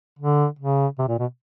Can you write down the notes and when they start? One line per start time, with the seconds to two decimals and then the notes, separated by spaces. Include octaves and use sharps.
0.19 D3
0.59 C#3
0.99 C3
1.08 A#2
1.19 B2